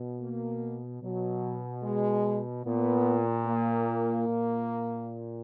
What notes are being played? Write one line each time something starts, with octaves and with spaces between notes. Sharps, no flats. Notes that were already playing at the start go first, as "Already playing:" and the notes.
Already playing: B2
A#3
B2 F#3
G#3
A#2 B3
A#3
A#2